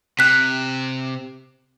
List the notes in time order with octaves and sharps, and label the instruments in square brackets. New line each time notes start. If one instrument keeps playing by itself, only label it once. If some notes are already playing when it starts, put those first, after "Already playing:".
[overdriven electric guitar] C3 [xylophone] F#6 B6